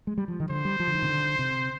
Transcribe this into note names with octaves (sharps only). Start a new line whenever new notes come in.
G#3
G3
F3
D#3
D3 C5
G3
F3
D3
D#3
C3
D3
C3